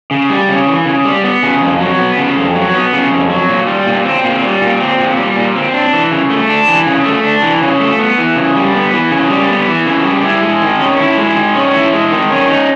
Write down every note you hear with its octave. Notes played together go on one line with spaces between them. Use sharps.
C#3
G3
C#3
E3
C#3
G3
B3
C#3
F2
F#3
B3
C#3
F2
F#3
B3
C#3
F2
F#3
A#2
G3
A#2
C4
A#2
G3
A#2
C4
A#2
G3
A#2
C4
D4
E3
C#3
A3
D4
E3
C#3
A3
D4
E3
C#3
A3
B3
E3
C#3
G3
B3
E3
C#3
G3
B3
E3
C#3
G3
E4
G#3
D#3
C#4
E4
G#3
D#3
C#4
E4
G#3
D#3
C#4
D#4